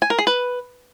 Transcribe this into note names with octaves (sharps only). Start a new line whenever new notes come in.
G#5
A#4
G#4
B4